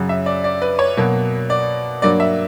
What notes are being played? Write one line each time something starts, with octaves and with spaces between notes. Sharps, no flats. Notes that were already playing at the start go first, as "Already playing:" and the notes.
Already playing: F#2 C#3 F#3
E5
D5
D5
B4
C#5
B2 F#3 A#3
D5
G2 F#3 A#3 D5
E5